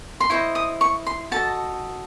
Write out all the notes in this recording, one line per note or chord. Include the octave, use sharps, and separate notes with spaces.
C6
E4 C5 D#5 C#6
D#6
C#6
C6
F#4 A4 D#5 A5